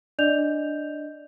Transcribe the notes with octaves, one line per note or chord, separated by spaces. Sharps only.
D4 D5 D#5 G6 F7